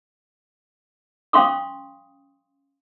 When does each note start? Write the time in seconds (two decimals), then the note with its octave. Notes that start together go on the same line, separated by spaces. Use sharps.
1.33 C#4 F5 C6 C#6 D#6